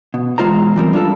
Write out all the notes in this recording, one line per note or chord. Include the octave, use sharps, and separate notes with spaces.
B2
E2 G#3 F4 C5 A#5
E3 G3 C4 A#4
G3 D4 F4 A4